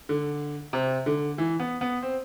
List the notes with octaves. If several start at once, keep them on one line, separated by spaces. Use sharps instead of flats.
D3
C3
D3
E3
B3
B3
C4